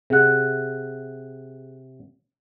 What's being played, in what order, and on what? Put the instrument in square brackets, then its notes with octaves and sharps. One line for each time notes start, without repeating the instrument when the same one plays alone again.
[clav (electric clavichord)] C3 F#5 [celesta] G#4 F#6